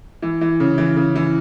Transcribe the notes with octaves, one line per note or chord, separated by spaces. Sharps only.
E3
E3
C#3
E3
C#3
E3